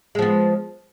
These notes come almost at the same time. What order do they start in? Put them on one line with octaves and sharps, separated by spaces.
G#3 F3 B3